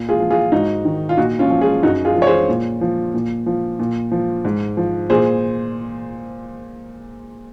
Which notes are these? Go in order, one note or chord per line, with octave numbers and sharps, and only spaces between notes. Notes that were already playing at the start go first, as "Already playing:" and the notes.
Already playing: A#2
F4 G#4
F3
F4 G#4
G#2 D#4 F#4
D#3
F4
A#2 D#4 F#4
C#4 F4
F3
F4 G#4
F#2 D#4 F#4
F4 G#4
F3
C#5
G#4 C5
A#2
F3
A#2
F3
A#2
F3
G#2
F3
A#2 G#4 C5